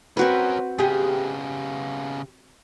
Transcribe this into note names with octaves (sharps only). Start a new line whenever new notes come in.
C4 C#4 F#4 A#4 B4
C#3 B3 G4 G#4